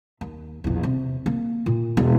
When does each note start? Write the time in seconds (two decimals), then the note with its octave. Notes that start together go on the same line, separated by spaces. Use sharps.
0.21 D#2
0.64 A#1 E2
0.83 C3
1.26 A#3
1.66 A#2
1.97 E1 B3